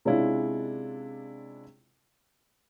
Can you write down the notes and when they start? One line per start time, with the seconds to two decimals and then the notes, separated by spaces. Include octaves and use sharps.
0.05 C3 G#3 C#4 D4 E4 F4